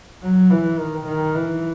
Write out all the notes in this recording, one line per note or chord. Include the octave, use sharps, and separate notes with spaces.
F#3
E3
D#3
D#3
E3